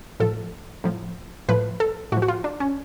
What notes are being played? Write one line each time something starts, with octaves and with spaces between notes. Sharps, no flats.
A2 F3 A4
A2 F3
A2 F3 B4
A4
A2 F3 F#4
F#4
F4
D4
C#4